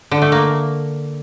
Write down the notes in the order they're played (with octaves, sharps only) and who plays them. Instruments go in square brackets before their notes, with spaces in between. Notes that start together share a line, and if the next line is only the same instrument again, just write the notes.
[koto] D3
A3
A#3